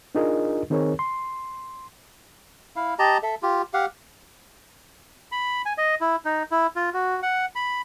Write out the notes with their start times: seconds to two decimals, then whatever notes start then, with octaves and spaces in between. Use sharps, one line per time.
0.15 D4 D#4 F4 G#4 A#4 D#5
0.70 D#3 C4 D#4 G#4 A#4 C#5
0.99 C6
2.76 E4 F5
2.99 G4 D#5 A5 A#5
3.23 A4 E5
3.42 F4 G4
3.74 G4 F5 F#5
5.32 B5
5.66 G#5
5.78 D#5
6.01 E4
6.25 D#4
6.51 E4
6.76 F4
6.94 F#4
7.23 F#5
7.55 B5